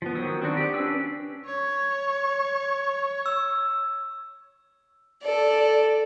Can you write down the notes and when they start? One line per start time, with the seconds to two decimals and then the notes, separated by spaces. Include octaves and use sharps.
0.02 F3 B3
0.15 D#3 F#3 C5 C#5 D#6
0.42 C4 D4 F#4
0.57 G4 D5
0.74 C#4 D4 B4 E6
1.46 C#5
3.26 E6
5.23 A4 D5